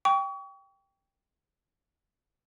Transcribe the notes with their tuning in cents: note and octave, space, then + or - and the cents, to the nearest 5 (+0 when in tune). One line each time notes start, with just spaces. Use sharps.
G5 +0 C#6 +35